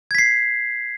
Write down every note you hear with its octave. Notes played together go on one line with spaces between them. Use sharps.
G#6 B6 C7